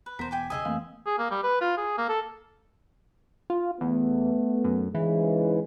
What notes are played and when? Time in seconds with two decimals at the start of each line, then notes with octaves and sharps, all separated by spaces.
0.06 B4
0.19 E1 E2 B3 A#4 C5 A5 B6
0.31 G5 G#5 D6
0.50 E1 C2 C#3 G#4 D#5 G#5 D#6 E6
0.65 F2 E3 A3 A#3 C4 F5
1.06 G#4
1.19 A#3
1.31 G3
1.43 B4
1.61 F4
1.78 G#4
1.98 A#3
2.09 A4
3.50 F4
3.81 E2 A3 B3
4.64 F#2
4.95 G#2 C#3 E3 G#3